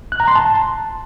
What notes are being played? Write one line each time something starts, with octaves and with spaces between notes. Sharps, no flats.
F#6
A#5
C6
A5